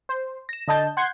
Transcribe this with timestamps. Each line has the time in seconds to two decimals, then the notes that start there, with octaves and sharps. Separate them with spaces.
0.09 C5
0.49 A#6 E7
0.68 D3 D#5 A5 G6
0.97 F#5 C6 G6 G#6